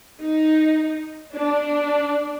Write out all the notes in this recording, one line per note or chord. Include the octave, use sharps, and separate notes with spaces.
D#4
D4